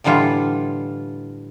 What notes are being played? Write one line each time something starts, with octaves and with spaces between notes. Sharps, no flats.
A2 D3 E3 G3 F4